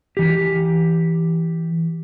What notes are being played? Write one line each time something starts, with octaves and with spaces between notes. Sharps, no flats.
E3 G4